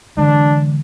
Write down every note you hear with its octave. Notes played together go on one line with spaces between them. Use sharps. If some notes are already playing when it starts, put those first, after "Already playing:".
D3 E3 G#3 D4